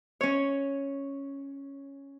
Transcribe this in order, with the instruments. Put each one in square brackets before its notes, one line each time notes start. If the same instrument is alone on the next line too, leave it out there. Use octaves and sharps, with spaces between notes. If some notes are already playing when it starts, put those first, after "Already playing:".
[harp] C#4 C#5